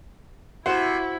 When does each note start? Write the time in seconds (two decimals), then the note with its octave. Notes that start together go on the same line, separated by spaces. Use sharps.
0.66 C3 E4 F#4 C5 E6